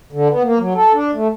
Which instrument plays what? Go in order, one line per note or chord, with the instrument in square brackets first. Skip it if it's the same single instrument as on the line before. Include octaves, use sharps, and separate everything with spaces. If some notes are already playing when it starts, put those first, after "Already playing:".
[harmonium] D3
B3
A#3
F#3
A4
D4
A3